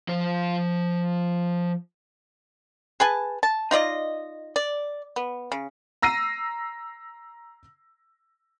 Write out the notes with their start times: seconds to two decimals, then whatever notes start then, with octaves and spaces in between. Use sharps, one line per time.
0.08 F3 C5
3.00 G#4 B4 G#5 A5
3.43 A5
3.71 D#4 F4 D5 D#5
4.56 D5
5.16 B3
5.52 C#3
6.02 A#5 E6 A#6 C7 D#7